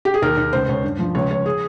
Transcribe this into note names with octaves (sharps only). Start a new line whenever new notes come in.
G4
G#4
D#2 A#4
D#2
C#2 C5
C#2 C#5
G2
F3
C#2 C#5
C#2 C#5
G#4